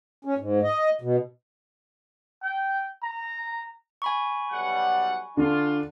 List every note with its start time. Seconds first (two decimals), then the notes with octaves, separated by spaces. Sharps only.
0.25 C#4
0.38 G#2
0.63 D#5
1.01 B2
2.43 G5
3.03 A#5
4.02 G#5 B5 C#6
4.52 B1 G3 F#5
5.37 D3 D4 F4